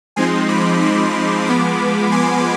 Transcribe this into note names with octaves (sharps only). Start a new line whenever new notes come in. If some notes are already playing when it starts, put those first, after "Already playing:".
F3 G#3 C4 D#4 G#5 C6
B5 D6
B5 D6
F3 G#3 B3 B5 D6
G#5 C6